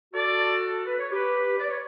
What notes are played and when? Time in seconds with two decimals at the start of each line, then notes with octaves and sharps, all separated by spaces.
0.14 F#4 A4 D5
0.87 B4
0.99 C#5
1.12 G4 B4
1.60 D5
1.70 C#5